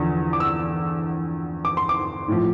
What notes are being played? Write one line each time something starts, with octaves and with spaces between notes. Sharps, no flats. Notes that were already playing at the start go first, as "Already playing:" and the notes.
Already playing: E2 D3 F3
D6
E6
D6
C6
D6
A2 F3